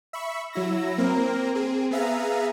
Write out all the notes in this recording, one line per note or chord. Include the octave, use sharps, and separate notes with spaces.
E5 B5 C#6 E6
F#3 E4 E6 A#6
A#3 C4 A#4
C4 G#4
B3 G#4 E5 F5 A#5